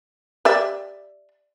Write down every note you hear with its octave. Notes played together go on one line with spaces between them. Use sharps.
G4 D5 E5